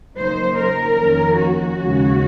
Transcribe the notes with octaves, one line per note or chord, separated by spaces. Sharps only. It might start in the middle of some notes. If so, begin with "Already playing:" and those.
C#3 F#3 A#3 D#4 C5
A#4
F2 D#3 A#3 C#4
F#4
D#2 C#3 G#3 C#4